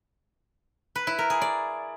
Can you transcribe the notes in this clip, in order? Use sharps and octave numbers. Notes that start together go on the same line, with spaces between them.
B4
E4
A#4
G#4
D5